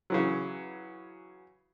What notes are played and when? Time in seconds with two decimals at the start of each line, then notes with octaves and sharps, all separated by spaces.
0.10 C#3 E3 F#3